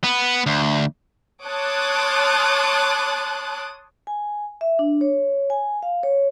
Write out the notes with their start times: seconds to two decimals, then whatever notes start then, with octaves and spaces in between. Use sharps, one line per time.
0.04 B3
0.46 D2
1.45 C#5 A5 C6 D6 D#6 F#6
4.07 G#5
4.61 E5
4.79 D4
5.01 C#5
5.50 G#5
5.83 F5
6.03 C#5